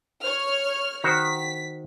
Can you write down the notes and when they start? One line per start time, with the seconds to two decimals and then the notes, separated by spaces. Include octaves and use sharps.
0.21 C#5 F6
1.04 D#3 F#4 C5 B6